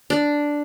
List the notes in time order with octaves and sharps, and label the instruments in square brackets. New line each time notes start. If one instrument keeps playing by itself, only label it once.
[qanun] D4